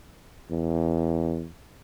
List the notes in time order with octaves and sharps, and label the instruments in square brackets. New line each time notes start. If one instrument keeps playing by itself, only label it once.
[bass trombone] E2